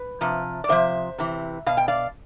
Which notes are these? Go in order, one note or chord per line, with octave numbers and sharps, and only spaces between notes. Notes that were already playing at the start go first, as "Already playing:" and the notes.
Already playing: B4
C3 F3
D5
C3 F3 C5 E5
C3 E3
B2 F5
G5
D5 F5